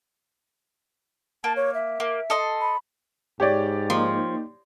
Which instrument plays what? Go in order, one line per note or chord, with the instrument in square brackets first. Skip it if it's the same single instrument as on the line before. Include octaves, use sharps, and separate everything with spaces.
[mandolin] A#3 [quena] A5
[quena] C#5
E5
[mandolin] A#3
A4 D#5 C6
[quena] B5
[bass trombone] G#2 [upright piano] G4 C#5 D5
[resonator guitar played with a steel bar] F3 [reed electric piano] A#3 D#4